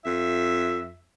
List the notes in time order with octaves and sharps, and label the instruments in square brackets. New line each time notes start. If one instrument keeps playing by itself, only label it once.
[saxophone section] F2 E5